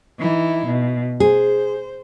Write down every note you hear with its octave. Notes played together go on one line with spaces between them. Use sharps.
E3 D#4 E4
B2
G#4 C5